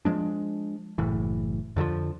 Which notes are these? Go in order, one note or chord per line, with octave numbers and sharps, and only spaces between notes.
F3 F#3 G#3 D4
F#1 A2 E3
F2 D3 D#3 F3